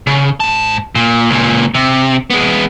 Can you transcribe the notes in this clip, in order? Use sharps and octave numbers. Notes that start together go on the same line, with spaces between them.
C#3
G#2 A5
A#2
C#2 A#2
C3
G#3 B3